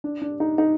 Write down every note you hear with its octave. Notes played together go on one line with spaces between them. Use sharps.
D4
D4
D#4
D#4